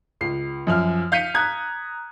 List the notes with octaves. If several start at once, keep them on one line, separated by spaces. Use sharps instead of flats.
C#2 C7
F#2 F3 F6
F5 G6 B6 C#7 D#7
A#5 D#6 F#6 G#6